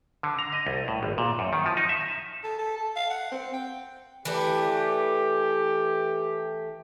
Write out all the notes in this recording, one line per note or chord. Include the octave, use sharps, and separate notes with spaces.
D3
A#5
D#5
C2
A2
G#1
A#2
F#2
D#3
F3
D#4
E5
A4
A4
A4
F5
F#5
C4
G5
E3 A3 G4 D5